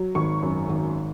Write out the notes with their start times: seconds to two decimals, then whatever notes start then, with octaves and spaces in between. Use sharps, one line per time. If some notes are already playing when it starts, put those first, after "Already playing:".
Already playing: F#3
0.15 G#1 C#6
0.43 F#2
0.69 G#1